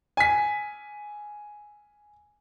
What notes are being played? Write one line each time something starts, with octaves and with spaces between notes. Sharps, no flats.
G#5 B6